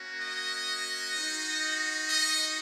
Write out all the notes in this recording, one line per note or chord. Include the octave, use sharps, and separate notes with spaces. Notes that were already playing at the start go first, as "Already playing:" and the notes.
Already playing: A#3 C#4 F#4
D#5
G#3 D#4 F#4
D#5